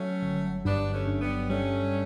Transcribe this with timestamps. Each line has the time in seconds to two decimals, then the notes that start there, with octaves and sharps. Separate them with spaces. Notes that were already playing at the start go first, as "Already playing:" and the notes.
Already playing: F#3 A3 C#4
0.22 G1
0.65 G2 B3 D4
0.93 A3 C#4
1.07 G2
1.21 G3 B3
1.49 G3 A3 C#4